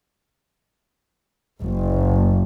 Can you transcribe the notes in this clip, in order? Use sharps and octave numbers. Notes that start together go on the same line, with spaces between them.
F#1